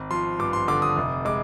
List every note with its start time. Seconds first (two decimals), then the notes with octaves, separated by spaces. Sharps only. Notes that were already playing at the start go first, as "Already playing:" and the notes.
Already playing: G#1
0.11 F3 C6
0.39 G2 D6
0.53 C6
0.68 D3 D6
0.82 D#6
0.96 F1
1.25 G#3 D6